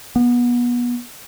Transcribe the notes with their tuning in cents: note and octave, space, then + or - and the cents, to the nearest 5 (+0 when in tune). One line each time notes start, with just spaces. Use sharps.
B3 -25